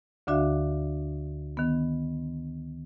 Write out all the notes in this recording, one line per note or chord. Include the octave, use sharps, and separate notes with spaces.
D2 D3 D4 F#4 E5 F5
D#3 B3